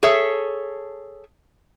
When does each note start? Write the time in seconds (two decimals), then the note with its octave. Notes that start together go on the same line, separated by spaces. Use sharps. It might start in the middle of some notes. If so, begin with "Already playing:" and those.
0.03 G#4 A4 C#5 E5